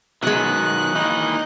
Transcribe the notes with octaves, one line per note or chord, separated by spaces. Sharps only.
B2 D#3 F#3 G#3 B3 F#6
D#3 E3 A#3 D#4